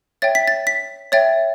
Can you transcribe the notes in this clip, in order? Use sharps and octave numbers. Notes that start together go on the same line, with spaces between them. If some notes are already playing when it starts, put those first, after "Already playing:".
C#5 E5 G5 A6
B6
A6
B6
C#5 E5 G5 A6